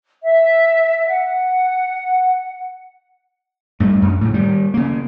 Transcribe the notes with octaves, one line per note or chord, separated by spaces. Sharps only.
E5
F#5
G2 A3
F#2
A2 C#3
D#3 G3
C#3 A#3